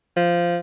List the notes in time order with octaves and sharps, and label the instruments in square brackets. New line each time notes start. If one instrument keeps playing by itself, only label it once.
[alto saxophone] F3